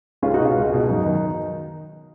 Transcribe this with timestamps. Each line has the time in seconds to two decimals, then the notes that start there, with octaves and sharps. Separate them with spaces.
0.22 C#2 C#4 F4
0.34 D#4 F#4
0.39 B2
0.45 C#4 F4
0.56 C#2
0.73 B2
0.89 F#2 D#4
1.06 D#3